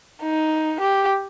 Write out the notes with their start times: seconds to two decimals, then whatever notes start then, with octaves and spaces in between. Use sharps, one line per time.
0.23 D#4
0.81 G4